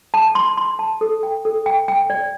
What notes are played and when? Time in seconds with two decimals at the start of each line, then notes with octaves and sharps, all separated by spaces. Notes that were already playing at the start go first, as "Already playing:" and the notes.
0.14 A5
0.35 C6
0.57 C6
0.79 A5
1.01 A4
1.23 G5
1.45 A4
1.66 G5
1.88 G5
2.10 D5